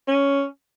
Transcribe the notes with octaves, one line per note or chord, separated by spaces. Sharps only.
C#4